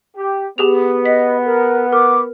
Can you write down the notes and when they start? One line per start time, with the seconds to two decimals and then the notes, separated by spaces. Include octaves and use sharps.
0.16 G4
0.58 B3 G4 G#4 F7
1.05 D#5 B6
1.45 A#4
1.92 A#4 D6